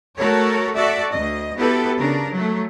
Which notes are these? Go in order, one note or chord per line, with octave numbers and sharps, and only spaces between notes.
A3 F#4 A4 A#4 C#5
F#4 A4 D5 E5
D2 D#5
B3 E4 F#4 G4 A4 B4
C#3 D4 A#4
F#3 A3